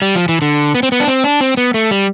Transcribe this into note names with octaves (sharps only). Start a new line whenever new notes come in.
G3
F3
E3
D3
B3
C4
B3
D4
C4
D4
C4
B3
A3
G3